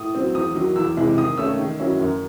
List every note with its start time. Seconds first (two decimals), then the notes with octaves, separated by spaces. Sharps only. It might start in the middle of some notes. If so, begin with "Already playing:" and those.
Already playing: A2 D#6
0.15 F#3 C4
0.34 E2 D#6
0.55 D#3 F#3
0.76 E2 E6
0.97 C3 E3 G#3
1.18 D#3 D#6
1.37 A3 C#4 E6
1.59 D#3
1.80 F#3 C#4 E4
2.00 F#2